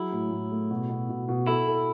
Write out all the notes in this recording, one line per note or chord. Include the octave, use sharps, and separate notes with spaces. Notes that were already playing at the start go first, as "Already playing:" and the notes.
Already playing: F#3 E4 G#4
A2
A2
A3
B2
B2
B2
B2
E4 A4
A4